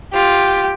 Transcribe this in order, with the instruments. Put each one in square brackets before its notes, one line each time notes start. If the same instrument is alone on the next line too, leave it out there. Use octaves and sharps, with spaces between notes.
[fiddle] F4 [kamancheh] G4